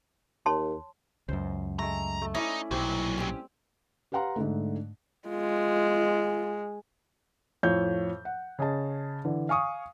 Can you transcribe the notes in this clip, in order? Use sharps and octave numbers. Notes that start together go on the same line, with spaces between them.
D#2 C#5 A5 C6
C#2 F#2 C5
G#3 A3 A#5
A3
C#4 D#4 E4 D5
B1 A#2 F#3 G3 C4 G4
C4 C#4 G4
G4 B4 F5 F#5 A#5 C6
G#2 D3 A3
G#3 F4
F2 A2 C#5 F5 G6
F#5
C#3 G#4 D#5 A5
D3 E3
F5 G#5 C#6 D#6